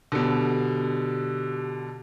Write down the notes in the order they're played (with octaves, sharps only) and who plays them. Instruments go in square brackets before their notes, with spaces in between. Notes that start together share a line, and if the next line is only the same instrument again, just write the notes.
[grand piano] B2 D3 [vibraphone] G4